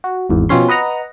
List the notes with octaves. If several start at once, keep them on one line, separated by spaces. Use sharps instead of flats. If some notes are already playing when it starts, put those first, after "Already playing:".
F#4
G#1 E2
B2 F3 C4 C#4 C6
B4 D#5 F#5 A#5